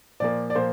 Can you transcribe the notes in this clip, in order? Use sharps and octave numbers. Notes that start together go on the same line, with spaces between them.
A#2 F3 A#3 D5
D5
A#2 F3 A#3 C5